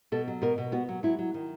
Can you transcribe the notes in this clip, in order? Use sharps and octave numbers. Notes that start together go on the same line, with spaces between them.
B2 A4
F#3
B2 A#4
B2
B3 F#4
F#3
F#3 E4
F#3
D#3